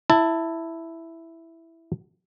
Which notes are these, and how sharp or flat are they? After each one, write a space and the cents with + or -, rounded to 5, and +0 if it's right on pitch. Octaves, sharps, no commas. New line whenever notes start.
E4 +0 A5 +20